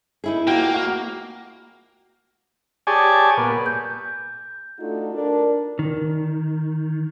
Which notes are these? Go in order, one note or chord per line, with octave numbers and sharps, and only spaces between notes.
D#4 E4 G#4
A#3 F4 F#4 G5
F#4
G4 G#4 C#5 D5 G#5 A5
A#2 B3
G6
A3 D4 D#4 F4 F#4 A4
D4 A#4
D#3